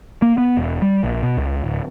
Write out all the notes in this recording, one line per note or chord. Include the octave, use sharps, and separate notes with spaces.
A#3
B3
E1
G3
A#1
B2
C#2
D1